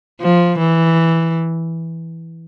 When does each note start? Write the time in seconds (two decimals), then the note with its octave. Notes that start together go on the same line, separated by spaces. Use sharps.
0.21 F3
0.58 E3